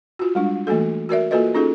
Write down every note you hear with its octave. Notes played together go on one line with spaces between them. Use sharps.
F4 F#4
G3 G#3 D4
E3 A3 A#3 F#4 A4
F#4 A#4 D5 E5
A#3 F4 F#4 A4 B4 D#5
C#4 D#4 F4 G#4 A4